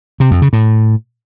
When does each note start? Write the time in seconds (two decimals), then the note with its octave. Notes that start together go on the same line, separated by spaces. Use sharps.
0.20 C3
0.31 F2
0.42 C#3
0.53 A2